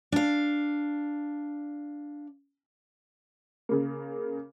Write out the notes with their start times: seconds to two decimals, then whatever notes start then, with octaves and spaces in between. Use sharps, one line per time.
0.12 D4 F5
3.69 C#3 A#3